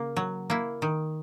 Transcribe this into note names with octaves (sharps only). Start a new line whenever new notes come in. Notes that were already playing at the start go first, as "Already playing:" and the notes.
Already playing: C#3 A#3
F#3
A#3 E4
D#3